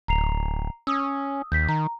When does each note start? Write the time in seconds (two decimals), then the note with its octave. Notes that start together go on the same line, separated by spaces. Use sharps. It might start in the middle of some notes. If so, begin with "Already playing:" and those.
0.08 D1 A#5 C7 F7
0.87 C#4 D#6 E6
1.52 D#2 G6 B6
1.69 D#3 A#5